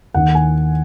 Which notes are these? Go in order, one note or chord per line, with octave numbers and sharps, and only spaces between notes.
D#2 D#3 F#5
G#5